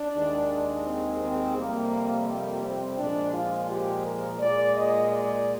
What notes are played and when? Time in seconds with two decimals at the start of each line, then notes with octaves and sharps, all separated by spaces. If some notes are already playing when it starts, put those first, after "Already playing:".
Already playing: D4
0.15 D#2 D#3 G#3
0.86 C4
1.20 C4
1.56 F2 C3 G3 A#3
2.27 A#3
2.63 C4
2.98 A#2 F3 G#3 D4
3.33 F4
3.69 G4
4.04 A#4
4.40 A#2 G#3 D5
4.74 D#5
5.10 D5